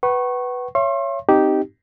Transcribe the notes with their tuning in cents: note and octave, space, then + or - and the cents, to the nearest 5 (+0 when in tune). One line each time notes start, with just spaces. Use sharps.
B4 +0 F#5 +35 C#6 -20
C#5 +0 E5 +40 C6 +40
C4 +0 D#4 +0 G4 -10